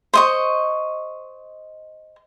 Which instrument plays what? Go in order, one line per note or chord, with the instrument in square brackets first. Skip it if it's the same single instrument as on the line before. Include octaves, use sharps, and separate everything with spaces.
[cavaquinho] C5 D#5 C#6